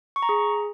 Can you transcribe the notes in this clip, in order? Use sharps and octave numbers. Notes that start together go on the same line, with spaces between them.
C#6
A#5
G#4